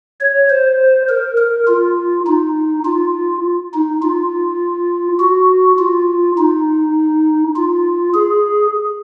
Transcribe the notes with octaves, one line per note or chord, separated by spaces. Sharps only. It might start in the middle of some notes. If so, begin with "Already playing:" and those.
C#5
C5
A#4
A#4
F4
D#4
F4
D#4
F4
F#4
F4
D#4
F4
G#4